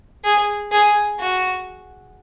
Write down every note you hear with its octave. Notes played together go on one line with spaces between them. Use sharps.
G#4
G#4
F#4